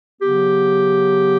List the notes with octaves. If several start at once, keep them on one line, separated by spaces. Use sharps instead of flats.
C#3 F#3 B3 G4